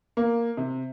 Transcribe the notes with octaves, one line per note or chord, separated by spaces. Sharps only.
A#3
C3